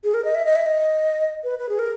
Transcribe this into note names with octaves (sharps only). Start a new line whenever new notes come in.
G#4
A#4
D#5
E5
D#5
E5
D#5
B4
B4
G#4
A#4